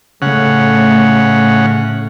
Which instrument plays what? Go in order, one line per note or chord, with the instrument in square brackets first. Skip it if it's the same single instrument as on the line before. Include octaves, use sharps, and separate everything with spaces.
[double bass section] A2 A3 [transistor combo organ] C#3 F#5